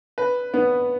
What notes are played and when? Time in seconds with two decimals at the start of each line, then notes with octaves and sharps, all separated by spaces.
0.18 B4
0.54 B3